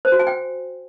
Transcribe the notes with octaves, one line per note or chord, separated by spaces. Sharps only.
C5
F#4
G#5
G5